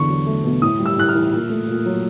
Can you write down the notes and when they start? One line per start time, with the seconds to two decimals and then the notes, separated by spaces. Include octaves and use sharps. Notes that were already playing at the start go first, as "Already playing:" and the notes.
Already playing: E2 D3 C#6
0.09 F#3
0.26 A3
0.44 B2
0.62 A2 D#6
0.79 G3
0.86 E6
0.98 A2 F#6
1.08 F6
1.15 E3
1.33 A#2
1.50 A3
1.68 A#2
1.86 F#3